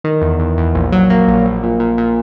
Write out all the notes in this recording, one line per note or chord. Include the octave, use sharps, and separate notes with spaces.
D#3
E2
E2
E2
A#1
F#3
A#3
A#1
A#1
A#2
A#2
A#2